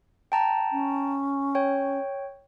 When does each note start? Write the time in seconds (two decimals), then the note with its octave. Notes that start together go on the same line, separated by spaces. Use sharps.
0.32 G5 A5 A#5
0.72 C#4
1.55 C#5 G5